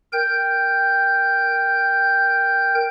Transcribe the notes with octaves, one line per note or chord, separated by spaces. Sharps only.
A#4 G5 G6